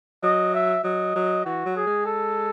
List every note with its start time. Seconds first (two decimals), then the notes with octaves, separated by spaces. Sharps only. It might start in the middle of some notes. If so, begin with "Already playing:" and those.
0.23 F#3 D#5
0.54 E5
0.84 F#3 D#5
1.16 F#3
1.45 E3 F#4
1.66 F#3
1.76 G#4
1.87 G#3
2.06 A4